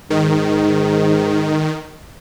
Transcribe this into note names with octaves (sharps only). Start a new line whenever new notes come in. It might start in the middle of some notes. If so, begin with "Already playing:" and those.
G#2 D#3